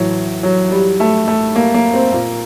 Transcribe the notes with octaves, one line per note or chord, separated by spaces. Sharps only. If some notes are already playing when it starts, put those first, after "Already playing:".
Already playing: A2 E3 F#3
F#3
G3
A3
A3
A#3
A#3
C4
A#2 A#3